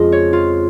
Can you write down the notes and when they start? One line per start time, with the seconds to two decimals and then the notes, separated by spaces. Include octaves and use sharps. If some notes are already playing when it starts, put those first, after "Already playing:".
Already playing: F2 C#3 G#3 F4 D#5
0.12 C#5
0.33 F4